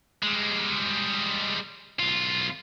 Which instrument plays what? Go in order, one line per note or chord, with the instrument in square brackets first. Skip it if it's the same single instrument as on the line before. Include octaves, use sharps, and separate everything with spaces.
[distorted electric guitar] G3 G#3
B1 F4